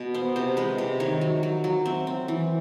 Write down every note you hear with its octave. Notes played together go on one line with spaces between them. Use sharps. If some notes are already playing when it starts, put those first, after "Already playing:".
Already playing: B2
B3 C5
C3 C5
G#3 B4
C3
D#3 C#5
F#3
F#3
F#3
C4 E5
C4
E3